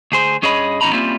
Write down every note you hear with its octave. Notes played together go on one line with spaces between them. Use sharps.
D2 G#4 C5
G2 C#4 G#4 C#5 D#5 B5
F2 B2 C#4 D#4 A#5 B5
G3 A#3 C4 C#4 E4 F4